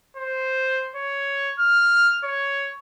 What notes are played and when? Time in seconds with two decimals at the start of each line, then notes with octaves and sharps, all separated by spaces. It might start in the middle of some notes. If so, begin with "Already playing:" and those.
0.17 C5
0.96 C#5
1.59 F6
2.24 C#5